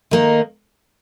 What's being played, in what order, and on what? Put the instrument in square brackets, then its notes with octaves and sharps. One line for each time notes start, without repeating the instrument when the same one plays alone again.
[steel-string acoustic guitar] D#3 A#3 D#4